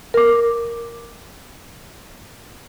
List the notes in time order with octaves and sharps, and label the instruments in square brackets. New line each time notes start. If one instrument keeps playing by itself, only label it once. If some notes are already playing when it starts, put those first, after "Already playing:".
[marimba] A#4 D6